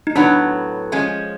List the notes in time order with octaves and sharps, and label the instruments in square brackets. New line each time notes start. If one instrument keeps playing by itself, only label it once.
[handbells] D#4
[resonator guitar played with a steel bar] A2 F#3 B3 [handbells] D4
[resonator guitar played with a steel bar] F3 G#3 C#4